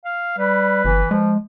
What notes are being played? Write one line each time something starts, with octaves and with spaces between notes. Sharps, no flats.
F5
G3 B4
G1 E3
F3 G#3